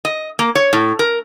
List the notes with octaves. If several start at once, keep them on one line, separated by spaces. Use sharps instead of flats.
D#5
A#3
C#5
A2
A#4